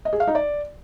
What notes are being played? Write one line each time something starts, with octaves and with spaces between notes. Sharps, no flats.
D#5
G#4
F5
D#4
D5